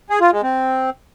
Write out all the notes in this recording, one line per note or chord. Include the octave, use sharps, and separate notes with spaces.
G#4
F4
G#3
C4